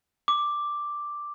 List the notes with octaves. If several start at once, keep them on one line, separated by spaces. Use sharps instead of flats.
D6